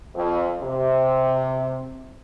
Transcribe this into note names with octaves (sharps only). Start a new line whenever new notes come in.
F2
C3